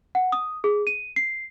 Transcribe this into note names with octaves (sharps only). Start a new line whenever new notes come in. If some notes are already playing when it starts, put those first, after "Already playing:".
F#5
D#6
G#4
D#7
C7